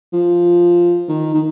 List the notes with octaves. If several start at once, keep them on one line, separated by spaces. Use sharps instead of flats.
F3
D#3
D#3